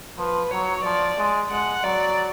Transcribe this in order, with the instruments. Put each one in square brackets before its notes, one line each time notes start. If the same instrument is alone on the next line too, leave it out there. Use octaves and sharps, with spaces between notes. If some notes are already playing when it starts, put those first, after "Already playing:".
[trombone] F3 [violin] B4
[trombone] F#3 [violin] C#5
[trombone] F3 [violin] D5
[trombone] G#3
[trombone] G#3 [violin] F#5
[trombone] F#3 [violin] D5